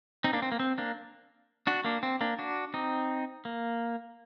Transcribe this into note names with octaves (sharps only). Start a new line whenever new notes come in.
C4 D#4
A#3 D4
C4
A#3
C4
A#3 D4
D4 F#4
A#3 D4
C4
A#3 D4
D4 F#4
C4 D#4
A#3